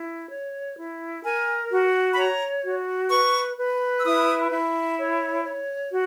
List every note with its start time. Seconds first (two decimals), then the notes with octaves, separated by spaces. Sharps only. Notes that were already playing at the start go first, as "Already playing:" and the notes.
Already playing: E4
0.31 C#5
0.77 E4
1.24 A#4 G#5
1.70 F#4
2.14 B5
2.17 C#5 A#5
2.63 F#4
3.11 B4 C#6
3.57 B4
3.98 E6
4.04 E4 D#6
4.51 E4
4.98 C#5
5.44 C#5
5.91 F#4